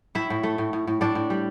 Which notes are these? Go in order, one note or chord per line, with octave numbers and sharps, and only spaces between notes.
A2 E4 E5
A2
A3
A2
A2
A2
A2 D4 D5
A2
G3